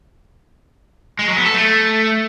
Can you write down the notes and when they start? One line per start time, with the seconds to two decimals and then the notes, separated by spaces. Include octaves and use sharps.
1.19 G#3
1.28 F#3
1.37 B3
1.46 A4
1.55 A3